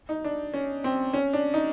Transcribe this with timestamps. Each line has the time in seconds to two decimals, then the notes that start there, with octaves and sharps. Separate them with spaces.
0.09 D#4
0.24 D4
0.54 C#4
0.84 C4
1.14 C#4
1.33 D4
1.54 D#4